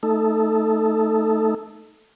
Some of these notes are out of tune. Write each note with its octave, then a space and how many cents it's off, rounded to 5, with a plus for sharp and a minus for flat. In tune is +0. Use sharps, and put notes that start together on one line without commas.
A3 +0 D#4 +0 A4 +0